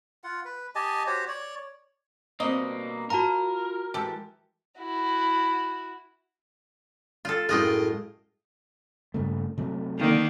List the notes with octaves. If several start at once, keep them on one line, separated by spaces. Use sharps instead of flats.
F4 F#5
B4
G4 D#5 G#5 A5
F#4 G4 C5 C#5
C#5 D5
B2 G3 A#3 C4 D4 D#5
F4 F#4 A#4 F5 A5 A#5
E3 G#3 G4 A4
E4 F#4
F4 A4
F#2 A2 G#3 F4 D#5 G5
G2 C#3 A3
C3 F#3 A3
D3 D#3 A#3